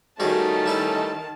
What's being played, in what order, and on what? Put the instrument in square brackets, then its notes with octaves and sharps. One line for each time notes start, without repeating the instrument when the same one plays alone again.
[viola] D#3 A5 [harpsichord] G3 F#4 G#4 [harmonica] A3 C#4 D#4
[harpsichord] G3 E4 B4